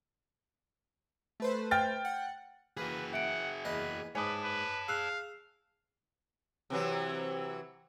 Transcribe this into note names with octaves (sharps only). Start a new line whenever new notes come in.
A3 B4 C5
G5 F6 A6
F#5
E3 A#3 F#4 G#4 B4
E5 F#5 D7
E2 A#3 B4 D#5
G#2 B4 C#5 G#5 A5 D6 D#6
B4
G#4 F5 E6 F#6
C3 E3 F#3